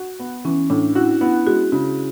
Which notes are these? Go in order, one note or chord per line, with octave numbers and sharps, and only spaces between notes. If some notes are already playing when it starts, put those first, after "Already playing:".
Already playing: F#4
B3
E3 C#4
A2 D4
E4 F#4
B3 E4
G#3 F#4
C#3